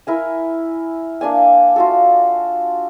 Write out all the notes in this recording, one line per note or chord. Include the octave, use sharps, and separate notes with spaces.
E4 A#4 G#5
A#3 D4 D5 G#5
F4 F#4 A4